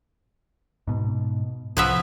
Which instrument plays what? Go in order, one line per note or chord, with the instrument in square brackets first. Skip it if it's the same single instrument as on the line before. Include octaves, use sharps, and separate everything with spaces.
[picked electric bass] G#2 B2
[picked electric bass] C2 [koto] F3 B3 E5